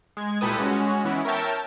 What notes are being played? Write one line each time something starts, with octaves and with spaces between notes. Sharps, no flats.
G#3 G#6
C2 A#2 G4 A4 B4 D#6
G#3 C#4 F#4
E3 B3 C#4 E4
A#4 C#5 E5 G5 A5